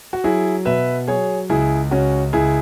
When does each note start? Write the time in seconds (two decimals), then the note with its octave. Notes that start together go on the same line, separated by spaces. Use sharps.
0.13 F#4
0.24 F#3 E4 G#4
0.65 B2 B4 E5
1.08 F#3 G#4 C#5
1.50 C#2 E4 G#4
1.91 C#2 C#4 F#4
2.33 C#2 E4 G#4